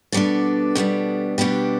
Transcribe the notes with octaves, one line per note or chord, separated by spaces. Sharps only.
B2 G3 B3 D4 A4
B2 G3 B3 D4
B2 G3 B3 D4 G4